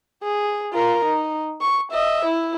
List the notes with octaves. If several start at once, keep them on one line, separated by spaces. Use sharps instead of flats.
G#4
F4 A#4
D#4
C#6
D#5 E5
E4